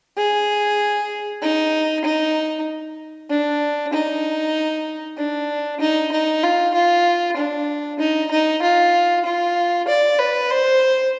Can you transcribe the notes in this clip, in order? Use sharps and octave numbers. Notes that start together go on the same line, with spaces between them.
G#4
D#4
D#4
D4
D#4
D4
D#4
D#4
F4
F4
D4
D#4
D#4
F4
F4
D5
B4
C5